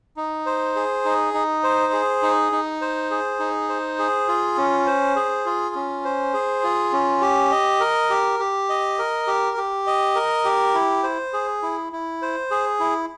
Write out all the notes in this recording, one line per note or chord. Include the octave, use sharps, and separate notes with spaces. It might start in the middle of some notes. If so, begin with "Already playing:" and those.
D#4
C5
G#4
D#4
D#4
C5
G#4
D#4
D#4
C5
G#4
D#4
C5
G#4
F4
C#4
C5
G#4
F4
C#4
C5
G#4
F4
C#4
G4
D#5
A#4
G4
G4
D#5
A#4
G4
G4
D#5
A#4
G4
E4
C5
G#4
E4
E4
C5
G#4
E4